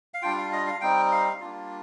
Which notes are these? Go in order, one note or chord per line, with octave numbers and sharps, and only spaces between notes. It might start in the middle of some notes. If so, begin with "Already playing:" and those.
F5
G3 D4 F4 G5
F5
D#5
F5
G3 C4 D#4 G5
F5
G3 A#3 D4 F4